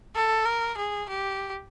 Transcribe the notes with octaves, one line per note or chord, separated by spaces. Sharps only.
A4
A#4
G#4
G4